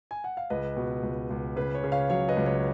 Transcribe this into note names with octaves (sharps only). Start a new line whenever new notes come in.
G#5
F#5
F5
C#2 B4 D#5
B2
C#2
C#2
C#3 B4
C#5
C#3
C#5 F5
F#3 C#5 F5
B4 D#5
C#2
C#5